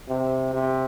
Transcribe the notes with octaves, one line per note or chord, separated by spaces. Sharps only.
C3
C3